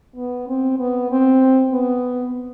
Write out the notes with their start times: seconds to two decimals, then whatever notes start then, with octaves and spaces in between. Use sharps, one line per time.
0.16 B3
0.48 C4
0.79 B3
1.11 C4
1.73 B3